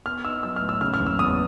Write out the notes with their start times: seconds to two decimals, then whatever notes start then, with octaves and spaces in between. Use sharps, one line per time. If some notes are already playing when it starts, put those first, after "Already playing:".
0.06 B3 F6
0.25 D#4 E6
0.43 F#3 E6
0.56 F6
0.62 A2
0.69 E6
0.81 C#3 F6
0.94 F6
1.00 F#1
1.06 E6
1.19 E2 D#6